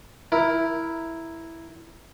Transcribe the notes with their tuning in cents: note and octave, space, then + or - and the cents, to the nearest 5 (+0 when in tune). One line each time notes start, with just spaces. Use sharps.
E4 +0 A#4 +0